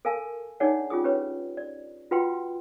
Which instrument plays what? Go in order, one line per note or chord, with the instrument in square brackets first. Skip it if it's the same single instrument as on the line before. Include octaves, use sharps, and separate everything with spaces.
[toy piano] A4 A#4 F5 G#5 A5
D4 D#4 G#4 C#5 D5 F#5
C#4 F4 G4 G#4 D#6
C#4 G4 B4 C#5
D5
F4 F#4 B4 F#5 G5 C6